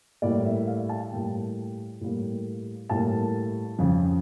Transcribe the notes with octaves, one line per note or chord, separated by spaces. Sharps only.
A2 G3 A#3 D5
E5
F5
A5
A2 G3 A#3 G5
A2 G3 A#3
A2 G3 A#3 A5
F2 C#3 F3